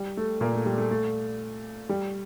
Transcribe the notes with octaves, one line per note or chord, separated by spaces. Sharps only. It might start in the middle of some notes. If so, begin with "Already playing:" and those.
Already playing: G3
A3
A#2 A#3
A3
G3
A3
A3
G3